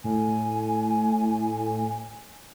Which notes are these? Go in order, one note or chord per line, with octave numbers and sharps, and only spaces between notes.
A2 G#5